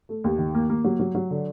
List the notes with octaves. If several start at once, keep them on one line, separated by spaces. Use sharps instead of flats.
A3
D#2
D#3
A#3
A#3
F#3
F#3
F#3
D3